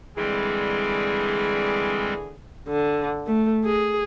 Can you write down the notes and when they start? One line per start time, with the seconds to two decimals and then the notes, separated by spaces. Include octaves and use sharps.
0.16 D3 E3 G3 G#3 C4 G#4
2.68 D3
3.26 A3
3.65 G#4